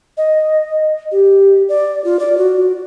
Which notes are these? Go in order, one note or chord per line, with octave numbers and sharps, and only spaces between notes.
D#5
G4
D5
F4
D5
F#4